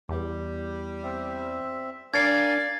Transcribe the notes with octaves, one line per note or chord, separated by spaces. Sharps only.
E2 G3
C4 E5
D4 A#4 D5 F5 G#5 G#6 A6 C7